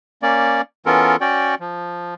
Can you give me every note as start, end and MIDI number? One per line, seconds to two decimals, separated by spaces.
0.22 0.61 58
0.22 0.61 61
0.22 0.61 74
0.86 1.16 52
0.86 1.16 59
0.86 1.16 61
0.86 1.16 65
0.86 1.16 69
0.86 1.16 70
1.21 1.55 61
1.21 1.55 66
1.21 1.55 74
1.21 1.55 79
1.60 2.14 53